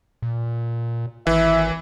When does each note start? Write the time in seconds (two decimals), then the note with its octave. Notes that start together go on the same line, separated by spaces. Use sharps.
0.22 A#2
1.27 G#1 E3 E5